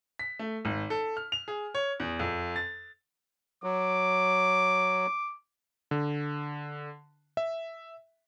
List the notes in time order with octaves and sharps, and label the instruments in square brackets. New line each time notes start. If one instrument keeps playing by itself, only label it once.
[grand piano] B6
A3
G#1
A4
F6
F7
G#4
C#5
E2
F2
A6
[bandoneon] F#3 [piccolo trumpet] D6
[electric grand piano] D3
E5